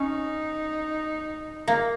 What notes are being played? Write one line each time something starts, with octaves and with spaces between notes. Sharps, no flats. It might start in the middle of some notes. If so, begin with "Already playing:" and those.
Already playing: C#4 D#4
A#3